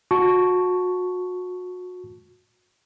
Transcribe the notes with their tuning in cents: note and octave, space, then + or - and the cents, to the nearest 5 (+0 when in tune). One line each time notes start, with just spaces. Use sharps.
F#4 -30 A5 +0 C#6 +5